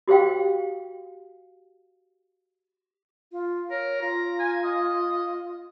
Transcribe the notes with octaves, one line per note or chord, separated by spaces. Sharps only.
F#4 G4 C5 F5 G5
F4
A#4 C#5
F4 A#5
G#5
D#5